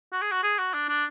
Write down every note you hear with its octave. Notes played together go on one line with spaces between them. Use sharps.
F#4
G#4
F#4
G#4
F#4
D4
D4